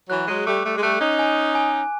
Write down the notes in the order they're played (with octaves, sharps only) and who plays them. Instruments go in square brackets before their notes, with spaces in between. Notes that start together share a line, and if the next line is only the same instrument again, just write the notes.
[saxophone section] E3 F#3 [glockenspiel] F#6
[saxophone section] F#3 G#3
[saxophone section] G3 A3 [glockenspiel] D6
[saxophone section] G3 A3
G#3
[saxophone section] G3 A3 [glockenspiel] F#6
[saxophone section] C#4 D#4
[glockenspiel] G#5
G#5